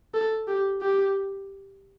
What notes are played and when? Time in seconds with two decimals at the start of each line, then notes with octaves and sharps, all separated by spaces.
0.14 A4
0.48 G4
0.82 G4